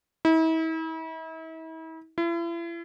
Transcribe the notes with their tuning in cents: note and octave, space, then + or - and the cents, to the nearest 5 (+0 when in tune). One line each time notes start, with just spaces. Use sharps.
E4 -40
E4 +40